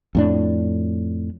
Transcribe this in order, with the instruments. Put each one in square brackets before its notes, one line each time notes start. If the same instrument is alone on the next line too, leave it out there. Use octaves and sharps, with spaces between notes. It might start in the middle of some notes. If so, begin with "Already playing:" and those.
[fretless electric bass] F2 A2 D4